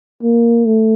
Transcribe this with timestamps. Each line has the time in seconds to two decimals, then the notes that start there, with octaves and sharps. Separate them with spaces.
0.23 A#3
0.66 A3